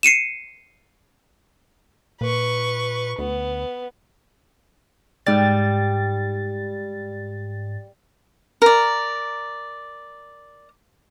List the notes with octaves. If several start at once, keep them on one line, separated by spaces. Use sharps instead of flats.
C7 C#7 D#7 E7
A#2 B4 C#6
D2 B3
G#2 G3 A6
A#4 D5